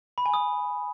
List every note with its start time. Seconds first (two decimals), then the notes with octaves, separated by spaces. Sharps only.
0.18 B5
0.26 G#5
0.34 D#6